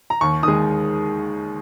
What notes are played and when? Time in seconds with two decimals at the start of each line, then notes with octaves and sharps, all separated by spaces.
0.10 A#5
0.21 D#2 C#6
0.43 D#3 G#3 D#6